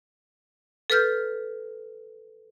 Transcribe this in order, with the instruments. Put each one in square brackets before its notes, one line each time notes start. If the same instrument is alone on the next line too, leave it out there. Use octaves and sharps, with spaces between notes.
[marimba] A4 B4 F6 G6